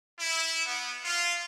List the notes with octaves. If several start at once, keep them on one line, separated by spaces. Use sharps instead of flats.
E4
B3
F4